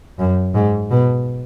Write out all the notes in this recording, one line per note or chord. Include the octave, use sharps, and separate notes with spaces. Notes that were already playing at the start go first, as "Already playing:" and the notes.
F#2
G#2
B2